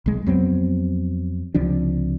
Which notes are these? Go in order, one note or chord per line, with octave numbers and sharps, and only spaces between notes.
B1 G#3
F2 F#3 B3 C4
C#2 C3 F3 D4